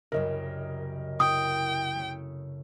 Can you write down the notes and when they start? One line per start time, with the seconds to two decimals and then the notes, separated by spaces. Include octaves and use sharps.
0.12 C2 F#2 C#3 A#4 D#5
1.20 E4 G5 D#6
1.95 C#3 A3